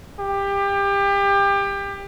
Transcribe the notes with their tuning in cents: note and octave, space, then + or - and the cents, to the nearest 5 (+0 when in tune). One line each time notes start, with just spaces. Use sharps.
G4 +25